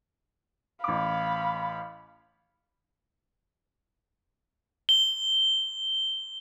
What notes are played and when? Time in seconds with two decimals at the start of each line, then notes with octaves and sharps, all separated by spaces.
0.84 A1 F5 B5 D6
4.89 G7